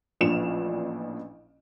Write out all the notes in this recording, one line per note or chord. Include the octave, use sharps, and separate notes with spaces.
A1 A#2 F3 D4 E7 F7